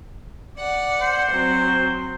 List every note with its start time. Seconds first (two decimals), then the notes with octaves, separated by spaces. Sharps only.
0.58 D5 F#5
1.01 C5
1.31 F#3 C4